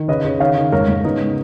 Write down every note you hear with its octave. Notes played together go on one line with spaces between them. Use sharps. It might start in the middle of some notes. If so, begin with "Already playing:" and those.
Already playing: D#3
C#3 B4 D#5
C#3
D#3 C#5 F5
D#3
G#2 A#4 C#5
G#2
C#3 B3 D#4